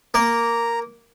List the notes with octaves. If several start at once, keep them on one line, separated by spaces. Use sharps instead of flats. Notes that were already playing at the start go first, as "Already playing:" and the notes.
A#3 A#5